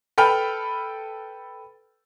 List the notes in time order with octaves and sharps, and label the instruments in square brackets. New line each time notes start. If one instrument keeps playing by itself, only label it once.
[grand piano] A4 B4 G5 B5 F6